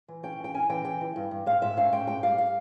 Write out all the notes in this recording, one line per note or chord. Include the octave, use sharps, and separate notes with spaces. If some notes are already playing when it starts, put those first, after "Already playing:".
E3
C#4 G5
E3 G5
C#4 G#5
E3 G5
E3 G5
E3
G2
G2
G#2 F5
G#2 E5
C#4 F5
G#2 G5
G#2 G5
G3 F5
F5